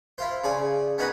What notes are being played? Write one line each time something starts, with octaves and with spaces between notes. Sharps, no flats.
E4 F4 C5
C#3 D5 G#5
B3 C#4 D#4 F#4 B4